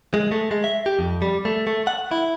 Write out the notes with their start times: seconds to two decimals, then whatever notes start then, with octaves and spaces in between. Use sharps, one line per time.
0.14 G#3
0.31 A3
0.51 G#3
0.64 E5
0.86 G4
0.99 F2
1.22 G3
1.45 A3
1.67 A3
1.87 F#5
2.11 E4